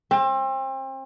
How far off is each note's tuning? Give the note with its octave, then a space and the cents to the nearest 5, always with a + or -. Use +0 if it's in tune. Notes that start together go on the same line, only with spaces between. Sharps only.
C4 +35